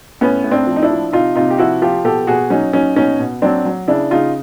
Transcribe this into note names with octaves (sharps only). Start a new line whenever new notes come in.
A2 B3 C#4
A2
C4 D4
F3
D#4
D4 E4
F3
C3 D#4 F4
C3 D#4 F4
G4
F3 E4 F#4
F3 F4 G4
B2 G4 A4
B2 F#4 G#4
F#3 C#4 D#4
F#3 C#4 D#4
B2 C#4 D#4
B2
F#3 C4 D4
F#3
C#3 D4 E4
C#3 D#4 F4